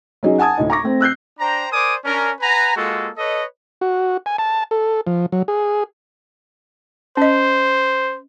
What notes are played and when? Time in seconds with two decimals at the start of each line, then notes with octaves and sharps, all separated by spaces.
0.23 F#3 C#4 D#4 G#4
0.38 F#5 G#5 A5 D#6 G#6
0.57 D2 A2 D#4
0.70 A#5 C#6 D6 A#6
0.83 A3 C4
1.01 E6 F#6 G6 C7
1.39 D4 C5 G5 A#5
1.73 A#4 C5 D5 G#5 D6 D#6
2.04 C#4 D4 A#4
2.41 B4 F#5 G#5 A#5
2.76 G#3 A#3 F4 F#4 A4
3.17 A4 B4 C#5 D#5
3.81 F#4
4.26 G#5
4.38 A5
4.71 A4
5.07 F3
5.32 F#3
5.48 G#4
7.17 C#4 C5 D#5